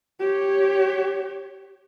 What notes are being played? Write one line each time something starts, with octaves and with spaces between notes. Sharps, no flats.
G4 C#5